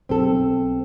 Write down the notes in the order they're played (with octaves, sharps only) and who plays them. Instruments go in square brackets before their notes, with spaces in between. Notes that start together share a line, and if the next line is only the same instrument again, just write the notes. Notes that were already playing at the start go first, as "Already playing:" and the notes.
[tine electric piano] B1 [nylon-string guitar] C4 A4